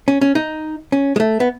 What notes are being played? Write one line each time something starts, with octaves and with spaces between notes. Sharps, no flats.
C#4
C#4
D#4
C#4
G#3
A3
B3